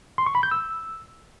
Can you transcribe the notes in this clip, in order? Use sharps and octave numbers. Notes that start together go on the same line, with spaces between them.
C6
C#6
B5
G6
E6